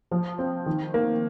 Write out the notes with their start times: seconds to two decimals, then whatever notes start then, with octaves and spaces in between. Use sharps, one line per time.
0.11 F3
0.39 C4
0.66 D#3
0.94 A#3